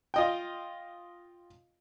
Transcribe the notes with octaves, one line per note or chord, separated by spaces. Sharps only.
F4 D#5 G5